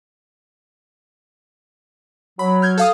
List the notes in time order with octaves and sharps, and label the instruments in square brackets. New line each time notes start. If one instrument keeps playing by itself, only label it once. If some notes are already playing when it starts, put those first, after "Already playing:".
[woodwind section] F#3 [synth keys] B5
[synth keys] F6 G6 G#6
A4 F5 D#6